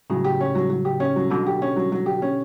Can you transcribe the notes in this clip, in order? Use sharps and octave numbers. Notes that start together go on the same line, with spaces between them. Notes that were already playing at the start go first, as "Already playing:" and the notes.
A2 C#3 F#3
G4
C#4
F#3
F#3
G4
C#4
F#3
B2 D3 F#3
G4
C#4
F#3
F#3
G4
C#4